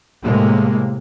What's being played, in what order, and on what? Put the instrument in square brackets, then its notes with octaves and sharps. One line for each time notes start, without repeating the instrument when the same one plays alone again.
[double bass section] A2 C3 G#3 A#3